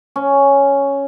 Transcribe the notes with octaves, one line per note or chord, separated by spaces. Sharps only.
C#4